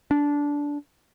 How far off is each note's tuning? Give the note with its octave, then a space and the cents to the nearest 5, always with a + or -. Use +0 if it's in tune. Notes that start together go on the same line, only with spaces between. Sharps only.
D4 -15